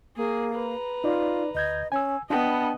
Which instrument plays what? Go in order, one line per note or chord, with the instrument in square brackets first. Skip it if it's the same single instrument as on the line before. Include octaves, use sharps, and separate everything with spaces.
[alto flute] A#3 [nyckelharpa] G#4
[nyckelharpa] B4 A#5
[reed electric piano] D#4 D5 [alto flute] F4
[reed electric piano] D2 G6 G#6 [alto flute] D#5
[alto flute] C#4 [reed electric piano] G#5 E6
[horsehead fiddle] B3 [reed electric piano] D4 G5 [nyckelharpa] D#5 B5 [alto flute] A5